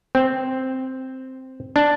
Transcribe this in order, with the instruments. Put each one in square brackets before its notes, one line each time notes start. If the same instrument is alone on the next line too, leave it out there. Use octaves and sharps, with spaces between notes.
[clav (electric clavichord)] C4
D4